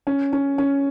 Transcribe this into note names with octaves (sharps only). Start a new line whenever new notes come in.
C#4
C#4
C#4